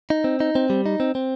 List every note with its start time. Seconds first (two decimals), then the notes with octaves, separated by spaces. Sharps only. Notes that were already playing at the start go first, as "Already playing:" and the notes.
0.10 D#4
0.24 C4
0.40 D#4
0.55 C4
0.70 G3
0.86 D#4
1.00 C4
1.15 C4